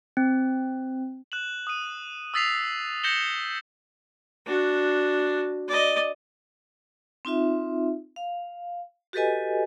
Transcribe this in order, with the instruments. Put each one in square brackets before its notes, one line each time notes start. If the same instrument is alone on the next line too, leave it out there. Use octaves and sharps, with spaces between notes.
[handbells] C4
[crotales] F#6 E7 F#7
D#6 D#7
D#6 E6 A6 B6 C7 F7
G6 A#6 C#7 E7 F#7 G7
[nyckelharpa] D4 F#4
D5 D#5
[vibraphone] C4 D#4 F4 E5
F5
F#4 G4 A4 B4 D#5 G#5